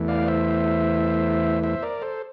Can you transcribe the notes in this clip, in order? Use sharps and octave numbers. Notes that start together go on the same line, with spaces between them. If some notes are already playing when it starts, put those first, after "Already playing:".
Already playing: E2 E3 A3
D5 F5
C5 E5
C5 E5
A#4 D5
A4 C5